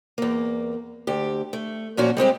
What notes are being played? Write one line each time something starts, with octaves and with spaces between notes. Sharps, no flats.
E2 A#3
D2 G4
A3
A#2 F3 C#4 F#4
G3 G#3 C4 G4